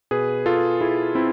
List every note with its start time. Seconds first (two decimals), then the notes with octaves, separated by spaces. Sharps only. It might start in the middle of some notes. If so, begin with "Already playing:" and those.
0.11 B2 G#4 B4
0.46 F4 A4
0.81 E4 G#4
1.15 C4 E4